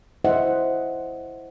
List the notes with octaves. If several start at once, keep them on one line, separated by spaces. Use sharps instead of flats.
E4 C5 D#5 E5 F#5